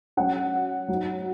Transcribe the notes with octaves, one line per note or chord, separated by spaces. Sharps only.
F#3 C#4 F#5
F#3
D#4